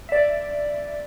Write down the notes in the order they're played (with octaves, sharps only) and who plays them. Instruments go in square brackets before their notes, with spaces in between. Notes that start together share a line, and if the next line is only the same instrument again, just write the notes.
[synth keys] D5 E5